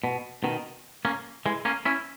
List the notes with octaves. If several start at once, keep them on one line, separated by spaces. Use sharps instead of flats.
B2
B2 D#3
A#3 C#4
E3 G#3
A#3 C#4
C#4 E4